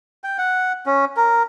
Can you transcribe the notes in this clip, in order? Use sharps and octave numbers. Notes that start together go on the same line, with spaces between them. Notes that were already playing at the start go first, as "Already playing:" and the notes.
G5
F#5
C#4
A#4